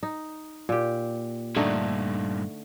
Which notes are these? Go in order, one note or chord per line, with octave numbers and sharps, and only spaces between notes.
D#4
A#2 G4
G2 A#2 D3 A3 D#4